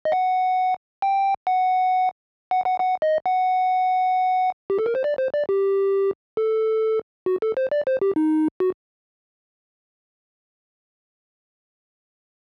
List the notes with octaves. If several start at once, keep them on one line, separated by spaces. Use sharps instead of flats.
D#5
F#5
G5
F#5
F#5
F#5
F#5
D#5
F#5
G4
A4
A#4
C5
D5
C5
D5
G4
A4
F#4
A4
C5
D5
C5
G4
D#4
F#4